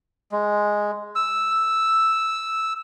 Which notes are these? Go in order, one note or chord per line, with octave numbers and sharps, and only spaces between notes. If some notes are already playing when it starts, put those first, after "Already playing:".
G#3
E6